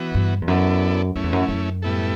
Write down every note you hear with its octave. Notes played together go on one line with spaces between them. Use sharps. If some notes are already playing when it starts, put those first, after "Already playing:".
Already playing: E3 B3 F#4
G2
E2
F#2 B3 E4 A4 D5
F#2 A3 C#4 E4
E2
F#2
F#2
A2 G3 B3 E4 A4